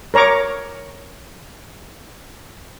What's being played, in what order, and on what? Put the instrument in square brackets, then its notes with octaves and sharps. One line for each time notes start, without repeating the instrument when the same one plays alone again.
[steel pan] A#4 C#5 A#5 C#6 D6